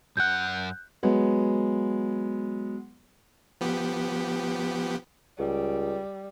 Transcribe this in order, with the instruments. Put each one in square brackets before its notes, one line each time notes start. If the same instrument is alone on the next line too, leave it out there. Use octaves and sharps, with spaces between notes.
[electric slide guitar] F#2 F#5 [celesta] F#6 G6
[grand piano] F#3 G#3 B3
[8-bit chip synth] F3 B3 G4
[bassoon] C#2 [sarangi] G3